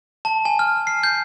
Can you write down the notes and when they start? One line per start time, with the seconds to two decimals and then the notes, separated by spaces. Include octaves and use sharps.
0.25 A5
0.45 G#5
0.59 F6
0.87 C7
1.03 G6